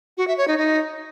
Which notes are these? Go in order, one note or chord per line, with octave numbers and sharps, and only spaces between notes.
F#4
E5
C#5
D#4
D#4